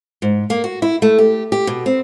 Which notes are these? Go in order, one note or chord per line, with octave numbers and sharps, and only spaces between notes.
G#2
A#3
F#4
E4
A3
G4
G4
B2
C4